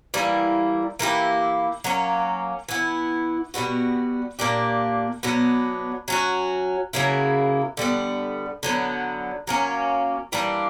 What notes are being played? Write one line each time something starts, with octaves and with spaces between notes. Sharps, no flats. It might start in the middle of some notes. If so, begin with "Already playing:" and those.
E3 G3 A#3 E4
E3 A#3 E4 G4
F#3 A#3 C#4
E3 B3 E4
B2 G3 B3 F#4
A#2 A#3 D4 G4
B2 F#3 B3 D4
F#3 C#4 F#4
C#3 F#3 A#3 E4
D3 G3 B3
D3 F#3 B3
F#3 A#3 C#4
E3 G3 A#3 D4